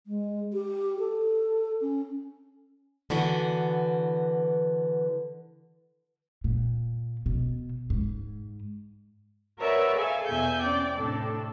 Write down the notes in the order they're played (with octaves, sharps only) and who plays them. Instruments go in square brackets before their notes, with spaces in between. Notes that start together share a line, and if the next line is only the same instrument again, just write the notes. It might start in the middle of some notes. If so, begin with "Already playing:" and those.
[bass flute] G#3
G4
A4
C#4
[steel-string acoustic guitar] D3 E3 B3 F#4
[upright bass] A#2
B2
G#2
[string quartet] F#4 A#4 B4 C#5 D5 E5
G#4 A4 E5 F5 G#5
E2 B2 E5 G#5 G6
C4 C#4 D5 G5
A2 C3 D4 A4